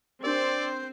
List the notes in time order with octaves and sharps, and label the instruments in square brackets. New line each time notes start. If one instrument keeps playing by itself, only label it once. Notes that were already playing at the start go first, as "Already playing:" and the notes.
[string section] C4 [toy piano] D4 G4 A#4 [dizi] C5 [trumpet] D5